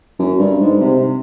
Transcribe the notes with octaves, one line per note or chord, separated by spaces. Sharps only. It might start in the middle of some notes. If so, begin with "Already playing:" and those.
F#2
G2
G#2
C3